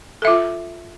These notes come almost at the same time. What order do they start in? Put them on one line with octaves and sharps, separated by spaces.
A4 E5 F4